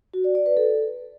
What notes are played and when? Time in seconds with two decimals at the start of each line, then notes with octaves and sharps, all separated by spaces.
0.14 F#4
0.24 D5
0.35 D5
0.46 B4
0.57 A4